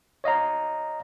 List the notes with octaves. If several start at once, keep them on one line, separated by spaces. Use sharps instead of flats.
C#5 D#5 F5 A#5